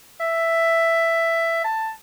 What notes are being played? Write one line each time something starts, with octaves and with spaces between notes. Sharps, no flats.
E5
A5